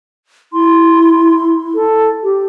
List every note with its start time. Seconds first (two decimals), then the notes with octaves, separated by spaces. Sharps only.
0.53 E4 C6
1.74 A4
2.23 G4